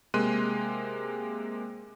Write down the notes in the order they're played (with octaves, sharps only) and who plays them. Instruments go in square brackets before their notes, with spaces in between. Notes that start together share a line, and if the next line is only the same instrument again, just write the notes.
[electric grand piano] C3 G#3 A#3 C6 F#6 D#7